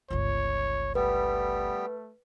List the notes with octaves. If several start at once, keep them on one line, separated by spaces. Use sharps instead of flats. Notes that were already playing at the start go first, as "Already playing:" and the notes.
G1 C#2 C#5
G3 A3 B3 B4